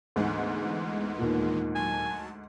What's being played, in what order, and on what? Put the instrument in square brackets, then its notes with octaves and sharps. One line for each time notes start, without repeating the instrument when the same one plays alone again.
[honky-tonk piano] D2 G#2 [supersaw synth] E3 G#3 B3
[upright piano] D#2 A#2
[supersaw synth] F#3 A5 [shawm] G#5